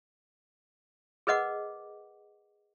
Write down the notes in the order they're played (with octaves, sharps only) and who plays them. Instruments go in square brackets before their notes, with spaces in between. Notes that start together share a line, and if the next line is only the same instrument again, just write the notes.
[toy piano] G#4 A#4 B4 D#5 F#5 D6